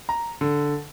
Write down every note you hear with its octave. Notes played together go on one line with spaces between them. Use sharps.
A#5
D3